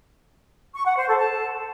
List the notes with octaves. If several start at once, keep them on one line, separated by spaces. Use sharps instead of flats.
C#6
F#5
C5
A4
A5